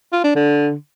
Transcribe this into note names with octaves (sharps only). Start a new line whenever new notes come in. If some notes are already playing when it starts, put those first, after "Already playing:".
F4
D4
D3